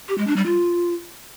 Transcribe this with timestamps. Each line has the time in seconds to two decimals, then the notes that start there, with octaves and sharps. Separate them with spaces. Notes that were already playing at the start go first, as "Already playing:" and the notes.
0.08 G4
0.18 G#3
0.27 D4
0.36 G3
0.46 F4